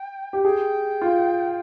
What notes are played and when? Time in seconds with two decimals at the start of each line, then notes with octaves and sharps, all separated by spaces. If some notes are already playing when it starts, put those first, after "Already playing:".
Already playing: G5
0.33 G4
0.44 G#4 G5
1.02 F4